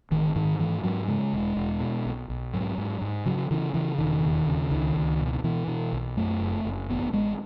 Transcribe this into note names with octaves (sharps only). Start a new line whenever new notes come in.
A1 D#3
G#2 D#3
G#2 E3
G#2 F#3
C#3 G#3
E1
E1
B2
B1
B1
G#2 F#3
G#2
G#2
C#3 F#3
C#3 E3
C#3 E3
E1 D#3
D#2
C#3
C#2 D#3
C#2
B2
B2 E3
B2
B1
F#2 A3
F#1
F#1
A1 B3
A1 G#3